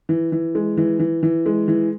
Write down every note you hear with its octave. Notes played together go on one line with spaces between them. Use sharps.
E3
E3
G#3
E3
E3
E3
G#3
E3